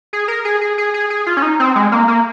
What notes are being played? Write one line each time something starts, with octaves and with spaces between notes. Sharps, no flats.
G#4
A#4
G#4
G#4
G#4
G#4
G#4
F4
C#4
D#4
C4
G#3
A#3
A#3